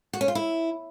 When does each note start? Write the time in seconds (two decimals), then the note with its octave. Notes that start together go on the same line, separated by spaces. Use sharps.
0.13 F#4
0.21 C#4
0.28 F4
0.35 E4